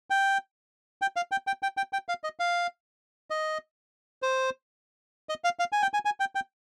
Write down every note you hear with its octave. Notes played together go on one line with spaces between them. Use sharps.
G5
G5
F5
G5
G5
G5
G5
G5
F5
D#5
F5
D#5
C5
D#5
F5
F5
G#5
G5
G#5
G#5
G5
G5